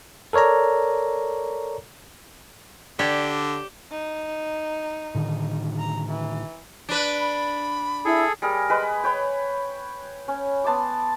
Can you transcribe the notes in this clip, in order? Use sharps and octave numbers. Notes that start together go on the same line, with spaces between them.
A4 A#4 C#5 D5 A#5
D3 G4 C#5 D5 D6 G6 G7
D#4
A2 D3 D#3
A#5
E3
D4 B4
B5
E4 G#4 A4
G3 G#4 A#4
G#3 B4
B4 C#5 G5
C#4
B3 A5 C6 D6